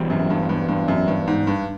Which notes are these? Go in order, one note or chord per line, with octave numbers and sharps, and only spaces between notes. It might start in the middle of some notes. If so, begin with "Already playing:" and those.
Already playing: E2 B2 G3 C4
F#2
G2
G2
G2
F#2
G2
G#2
G2